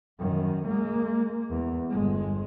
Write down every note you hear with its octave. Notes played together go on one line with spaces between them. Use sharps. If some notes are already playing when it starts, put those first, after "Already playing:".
F#2 D#3
G#3 A#3
E2
G1 G#3